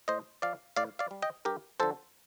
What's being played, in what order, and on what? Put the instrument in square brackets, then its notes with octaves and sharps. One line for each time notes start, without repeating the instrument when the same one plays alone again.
[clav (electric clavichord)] A2 C5 D#5
F3 D5 F5
A2 D5 F5
D5 F5
G3
D#5 G5
G2 G4 A#4
D3 F3 A4 C5